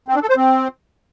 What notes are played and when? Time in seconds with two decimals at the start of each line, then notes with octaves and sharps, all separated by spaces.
0.08 C4
0.15 D4
0.22 A4
0.29 C5
0.37 C4